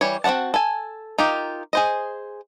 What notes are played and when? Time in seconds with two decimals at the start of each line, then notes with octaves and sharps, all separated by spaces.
0.01 E3 G3 C#5
0.24 C4 F#4 C#5 F#5 A5
0.54 A4 G#5
1.19 D#4 F4 G4 A#4
1.73 G#4 C5 D#5